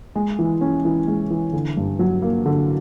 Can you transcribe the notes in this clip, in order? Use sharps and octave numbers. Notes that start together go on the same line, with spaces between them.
G#3
E3
C#4
E3
G#3
E3
D3
G2
F#3
A#3
D3